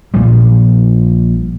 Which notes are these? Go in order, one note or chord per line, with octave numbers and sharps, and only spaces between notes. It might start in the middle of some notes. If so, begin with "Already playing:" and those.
A#1 A#2 F3 G3